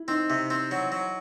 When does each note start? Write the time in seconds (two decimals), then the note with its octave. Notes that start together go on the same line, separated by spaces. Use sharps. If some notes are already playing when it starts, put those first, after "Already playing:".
Already playing: E4
0.08 C4 D#4
0.30 C3
0.50 C4
0.71 F#3
0.92 F#3